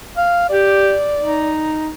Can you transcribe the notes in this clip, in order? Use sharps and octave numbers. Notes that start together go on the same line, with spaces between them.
F5
G4 D5
D#4